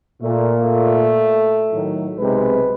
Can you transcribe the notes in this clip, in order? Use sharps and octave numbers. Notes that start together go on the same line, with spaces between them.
A#2 A3
A3
A2 D#3 F#3
B1 C3 G#3 B4